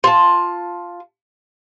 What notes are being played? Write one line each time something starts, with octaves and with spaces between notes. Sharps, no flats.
F4 A5